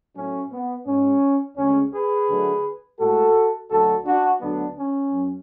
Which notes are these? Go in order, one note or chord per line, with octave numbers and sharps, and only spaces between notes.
A2 F#3 A3 C#4
B3
G#2 G#3 C#4
D2 C#3 G#3 C#4
G#4 B4
D2 D3 F#3 A3
A2 G#3 F#4 A4
D2 D3 F#3 F#4 A4
D4 F#4
D2 D3 F#3 B3 D4
C#4
F#2